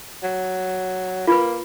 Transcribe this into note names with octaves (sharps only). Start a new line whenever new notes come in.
F#3
A#3 F4 B4